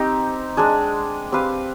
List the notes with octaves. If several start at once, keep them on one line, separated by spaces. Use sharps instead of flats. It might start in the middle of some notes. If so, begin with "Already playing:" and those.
Already playing: C4 D#4 G4
G#3 D4 G#4
C4 G4 B4 F5